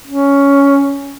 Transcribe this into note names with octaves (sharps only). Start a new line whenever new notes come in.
C#4